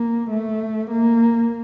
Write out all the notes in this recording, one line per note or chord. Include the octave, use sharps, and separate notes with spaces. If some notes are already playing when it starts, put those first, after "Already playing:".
Already playing: A#3
A3
A#3